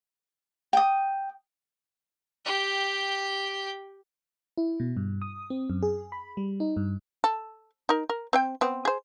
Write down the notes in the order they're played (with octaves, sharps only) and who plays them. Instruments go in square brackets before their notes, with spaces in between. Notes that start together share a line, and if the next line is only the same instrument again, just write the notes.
[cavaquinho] G5 D#6
[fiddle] G4 G5
[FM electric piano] E4
B2
G2
D#6
C4
F#2
G#4
B5
G3
D#4
G2
[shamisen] A4
D#4 A#4
A#4
C4 C5 G5
B3 C4
G#4 C5